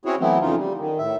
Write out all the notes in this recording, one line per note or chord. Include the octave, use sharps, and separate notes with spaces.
C4 C#4 E4 F#4 G#4 C#5
E3 F#3 A3 B3 C4 E4
F2 C#3 E3 D#4 F4
G3
D#3
A2 E5